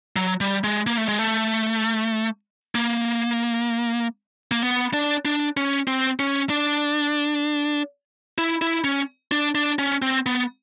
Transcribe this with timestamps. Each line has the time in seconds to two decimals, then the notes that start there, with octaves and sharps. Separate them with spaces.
0.16 F#3
0.41 G3
0.64 G#3
0.87 A#3
0.98 A3
1.08 G#3
1.19 A3
2.75 A#3
4.51 A#3
4.63 B3
4.94 D4
5.25 D4
5.57 C#4
5.87 C4
6.19 C#4
6.50 D4
8.38 E4
8.62 E4
8.84 C#4
9.32 D4
9.55 D4
9.79 C#4
10.02 C4
10.26 B3